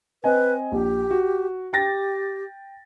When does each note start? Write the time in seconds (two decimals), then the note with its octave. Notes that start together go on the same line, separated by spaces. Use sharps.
0.24 C4 B4 D#5 G#5
0.72 A#1 G4
1.10 F#4
1.73 G4 G5 A6 A#6